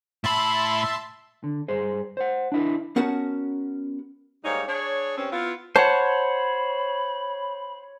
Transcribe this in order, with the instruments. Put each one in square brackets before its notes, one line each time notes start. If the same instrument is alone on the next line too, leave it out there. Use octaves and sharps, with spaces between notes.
[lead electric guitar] A2 B5 [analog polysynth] E5 A5 C6
[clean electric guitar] D3
G2 G#4 C5
C5 F#5
D4 E4 A#4
[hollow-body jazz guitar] B3 C#4 F#4 A#4 F#5 A5
[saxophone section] G#2 G3 A#3 D#4 C#5
D4 G#4 C#5
G2 C4 C#4
B3 E4 F4
[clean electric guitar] C5 F#5 [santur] C#5 [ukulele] A5 [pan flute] B5